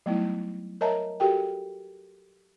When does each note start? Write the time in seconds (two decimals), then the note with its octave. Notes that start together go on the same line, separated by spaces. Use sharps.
0.06 F#3 G3 A3 B3 D#4 E4
0.81 A#4 C#5 D#5 E5 A5 A#5
1.20 F#4 G4 A4 A#4 G5